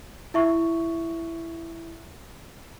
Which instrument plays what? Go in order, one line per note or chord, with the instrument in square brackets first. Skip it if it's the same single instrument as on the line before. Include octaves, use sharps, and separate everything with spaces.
[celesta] E4 E5 C#6